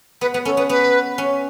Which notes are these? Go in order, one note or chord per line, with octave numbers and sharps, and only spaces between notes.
B3 B4
B3 B4
C#4 A4
B3 B4
B3 B4
C#4